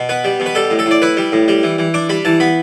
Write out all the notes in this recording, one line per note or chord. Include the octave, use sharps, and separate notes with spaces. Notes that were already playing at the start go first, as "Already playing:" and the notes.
Already playing: B2
B3 B4
G3
B2
B4
G3 A4
A2
A4
A2 D5
E4 B4
G3
A2
G3
E3
E3
D4 D6
G3 B5
E3 A5
B3 B5